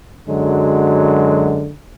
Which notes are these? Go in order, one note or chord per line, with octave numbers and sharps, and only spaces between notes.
F#2 D3 F#3 G#3